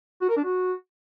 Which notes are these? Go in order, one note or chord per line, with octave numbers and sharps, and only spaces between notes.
F#4
A#4
D4
F#4